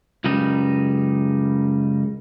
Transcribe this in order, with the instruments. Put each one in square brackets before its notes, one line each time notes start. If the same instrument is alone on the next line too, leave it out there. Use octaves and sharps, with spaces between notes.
[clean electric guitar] C#2 F#2 C#3 G3 D#4